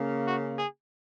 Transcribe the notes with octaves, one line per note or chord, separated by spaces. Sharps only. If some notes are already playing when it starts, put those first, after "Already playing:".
Already playing: C#3 A#3 C#4
F#4
G#4